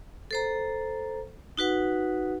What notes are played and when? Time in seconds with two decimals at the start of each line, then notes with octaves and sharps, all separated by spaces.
0.31 A4 C5 A#5
1.58 D#4 F#4 B4 F#5